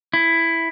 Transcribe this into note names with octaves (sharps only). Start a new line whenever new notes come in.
E4